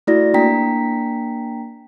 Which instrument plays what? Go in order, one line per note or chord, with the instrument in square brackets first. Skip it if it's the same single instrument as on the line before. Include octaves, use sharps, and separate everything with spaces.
[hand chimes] A3 E4 F#4 D5 A#6
A#3 D4 G5 A#5 B6